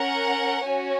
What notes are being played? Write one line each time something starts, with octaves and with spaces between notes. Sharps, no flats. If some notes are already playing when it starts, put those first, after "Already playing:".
Already playing: C#4 A#4 F#5
C#4 F#4 C#5 G#5